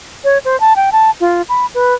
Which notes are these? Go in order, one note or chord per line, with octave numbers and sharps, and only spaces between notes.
C#5
C5
A5
G5
A5
F4
B5
B4